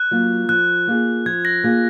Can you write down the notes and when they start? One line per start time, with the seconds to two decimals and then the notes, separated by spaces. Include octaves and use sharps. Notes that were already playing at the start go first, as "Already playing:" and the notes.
Already playing: F#6
0.11 F#3 A#3 F4
0.49 F3 F#6
0.87 A#3 F4 G#4
1.26 F3 G#6
1.45 A#6
1.63 A#3 F4 G#4